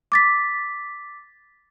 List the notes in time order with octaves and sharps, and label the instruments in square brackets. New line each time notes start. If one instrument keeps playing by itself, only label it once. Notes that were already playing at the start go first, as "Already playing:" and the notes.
[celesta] D6 A6 B6